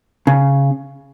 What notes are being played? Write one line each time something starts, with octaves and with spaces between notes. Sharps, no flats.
C#3